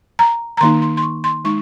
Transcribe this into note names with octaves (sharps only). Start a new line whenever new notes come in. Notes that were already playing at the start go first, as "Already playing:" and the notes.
A#5
A#5
D#3 A#3 D#4 C6
C6
C6
C#6
C6
G#3 D#4 C#6